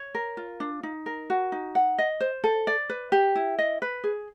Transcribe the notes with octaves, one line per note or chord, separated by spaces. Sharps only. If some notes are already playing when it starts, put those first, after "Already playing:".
Already playing: C#5
A#4
F4
D4
D#4
A#4
F#4
D#4
F#5
D#5
C5
A4
D5
B4
G4
E4
D#5
B4
G#4